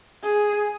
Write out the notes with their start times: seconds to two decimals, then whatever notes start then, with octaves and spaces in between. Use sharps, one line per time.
0.24 G#4